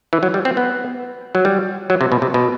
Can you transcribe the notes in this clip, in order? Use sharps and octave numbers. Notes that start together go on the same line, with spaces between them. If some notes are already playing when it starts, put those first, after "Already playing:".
E3
F#3
G3
C4
B3
F#3
G3
F#3
C3
B2
C3
B2